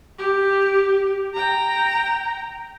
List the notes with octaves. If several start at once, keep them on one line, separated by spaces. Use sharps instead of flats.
G4
G5 A#5